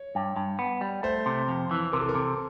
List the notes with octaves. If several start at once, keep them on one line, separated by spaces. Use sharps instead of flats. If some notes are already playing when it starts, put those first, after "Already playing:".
Already playing: C#5
G2
G2
B3
G3
A3 C5
C3
F2
E3
C3 A#4
A4
A#4
C3